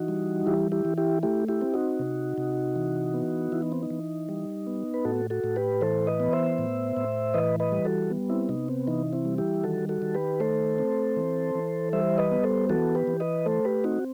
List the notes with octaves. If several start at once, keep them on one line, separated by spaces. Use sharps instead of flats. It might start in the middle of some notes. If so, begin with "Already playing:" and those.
Already playing: E3 D#4 F#4
G3
E3 E4 G4
E4 G4
E3
E4 G4
A3 E4 G4
E4 G4
C4
D#4 F#4
C3
C3
E3
B3
E3 E4
D#4
C4
D#4
E3
G3
B3
B4
A2 F#4 A4
F#4 A4
A2
G4 B4
E3 A4 C5
B4 D#5
B3
C5 E5
A2
A2
E3 B4 D#5
B4 D#5
G3
F#4 A4
B3
C4 E4
C3 D#4
C4
E3 D#4
C4 E4
G3
E4 G4
D#3 F#4 A4
F#4 A4
D#3
G4 B4
A3 A4 C5
C4
E3
E3
G3 C5 E5
B4 D#5
B3
A4 C5
E3 F#4 A4
G4 B4
E3
B4 D#5
A3 A4 C5
G4 B4
C4 D#4 F#4